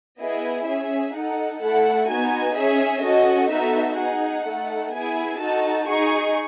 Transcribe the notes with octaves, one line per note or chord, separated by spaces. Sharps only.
B3 E4 G#4 D#5
C#4 G#4 E5
D#4 A4 F#5
A3 E4 A4 F#5
B3 D#4 F#4 G#5
C#4 G#4 E5
C#4 F#4 A4 D#5
B3 D#4 F#4 A4 E5
D#4 G#4 F#5
A3 D#4 A4
B3 E4 G#4 G#5
D#4 F#4 A4 A5
D#4 G#4 C#6